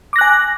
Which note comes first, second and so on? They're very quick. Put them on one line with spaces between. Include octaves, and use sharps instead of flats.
D6 A#6 F#6 G#5